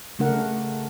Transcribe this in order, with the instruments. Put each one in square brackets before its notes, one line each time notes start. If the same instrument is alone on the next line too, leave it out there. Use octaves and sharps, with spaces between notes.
[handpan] C#3 A3 D4 A#4 F#5